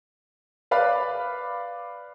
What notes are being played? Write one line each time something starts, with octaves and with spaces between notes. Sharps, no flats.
B4 D5 F5 B5 D6